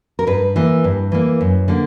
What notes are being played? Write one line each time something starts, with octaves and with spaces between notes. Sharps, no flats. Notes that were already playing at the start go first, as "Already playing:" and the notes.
A#4
G2 B4
E3 A#3
G2
E3 A#3
F#2
D3 A#3